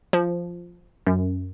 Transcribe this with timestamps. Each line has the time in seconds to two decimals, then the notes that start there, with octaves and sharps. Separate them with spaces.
0.13 F3
1.07 F#2